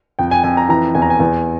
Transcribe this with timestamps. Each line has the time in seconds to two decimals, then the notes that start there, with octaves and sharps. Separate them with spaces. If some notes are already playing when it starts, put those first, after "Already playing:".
0.19 F2 G5
0.31 G#5
0.44 F2 G#5
0.57 A#5
0.69 E3 A#5
0.95 E2 G#5
1.02 A#5
1.10 G#5
1.20 E2